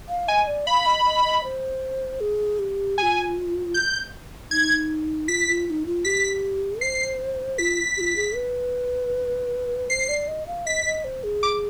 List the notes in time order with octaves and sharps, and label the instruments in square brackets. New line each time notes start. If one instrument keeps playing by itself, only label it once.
[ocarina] F5
[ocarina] D#5 [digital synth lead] G#5
[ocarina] D5
[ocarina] F5 [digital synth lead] B5
[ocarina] D#5
D#5
D#5
C5
G#4
G4
[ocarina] F4 G4 [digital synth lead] G#5
[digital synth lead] G6
[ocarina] D#4 [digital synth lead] G#6
[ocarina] F4 [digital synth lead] B6
[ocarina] F4
F4
D#4
F4
[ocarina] G4 [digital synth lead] B6
[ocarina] C5 [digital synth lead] C7
[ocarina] F4 [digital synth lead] B6
[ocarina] G4
F4
G#4
B4
[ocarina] C5 [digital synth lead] C7
[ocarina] D5
D#5
F5
[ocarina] D#5 [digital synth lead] B6
[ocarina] D#5
C5
G#4
[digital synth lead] D6